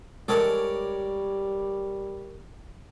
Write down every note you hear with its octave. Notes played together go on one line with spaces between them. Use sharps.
G3 G#3 A4 A#4 C#5 D5